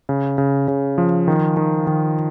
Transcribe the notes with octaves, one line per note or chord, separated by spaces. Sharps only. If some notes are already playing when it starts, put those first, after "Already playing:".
C#3
C#3
C#3
F3
D#3
D#3
D#3